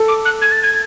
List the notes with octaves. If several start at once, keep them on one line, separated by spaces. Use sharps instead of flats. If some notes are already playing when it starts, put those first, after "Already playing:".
Already playing: A4
D6
F#6
G#6
A6
G#6